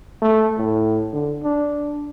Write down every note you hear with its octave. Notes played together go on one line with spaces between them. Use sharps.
A3
A2
D3
D4